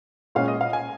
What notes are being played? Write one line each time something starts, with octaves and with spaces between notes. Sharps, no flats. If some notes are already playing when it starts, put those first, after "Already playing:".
A#2 G#3 C#4 F5
D#5
F5
G#5